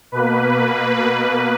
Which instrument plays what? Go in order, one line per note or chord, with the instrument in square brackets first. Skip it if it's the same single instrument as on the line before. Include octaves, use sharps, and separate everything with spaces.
[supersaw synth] B2 A#3 B4